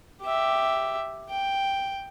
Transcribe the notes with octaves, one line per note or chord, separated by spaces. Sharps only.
G4 E5
G5